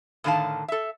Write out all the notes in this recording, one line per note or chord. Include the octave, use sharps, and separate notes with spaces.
A2 D3 D#3 E4 F5 A5
A4 E5